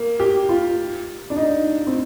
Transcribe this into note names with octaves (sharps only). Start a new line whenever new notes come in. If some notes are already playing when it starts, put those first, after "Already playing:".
Already playing: A#3
G4
F4
D4
D#4
C4